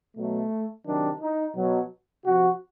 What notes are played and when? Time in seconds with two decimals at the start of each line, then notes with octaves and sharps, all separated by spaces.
0.16 B2 F#3 A3
0.85 C3 D#3 F#3 D4
1.20 D#4
1.55 B2 F#3
2.24 C3 F3 F#4